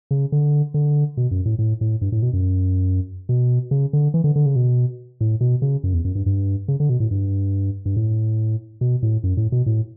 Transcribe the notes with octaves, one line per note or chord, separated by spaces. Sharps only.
C#3
D3
D3
B2
F#2
A2
A2
A2
G2
A2
B2
F#2
B2
C#3
D3
E3
D3
D3
C#3
B2
A2
B2
C#3
F#2
E2
F#2
G2
G2
C#3
D3
B2
A2
G2
G2
A2
B2
A2
F#2
A2
B2
A2